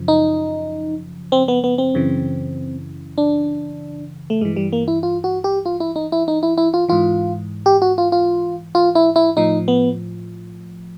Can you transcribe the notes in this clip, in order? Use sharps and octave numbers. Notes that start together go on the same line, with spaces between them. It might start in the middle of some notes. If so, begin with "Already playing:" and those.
Already playing: F#2 C#3 F3
D#4
C4
B3
B3
C4
F#2 C#3 E3
D4
A3
G2 E3 G#3
G3
A#3
E4
F4
F#4
G4
F4
E4
D#4
E4
D#4
E4
E4
F4
G#2 E3 F4
G4
F#4
F4
F4
F4
E4
E4
A2 F3 D#4
B3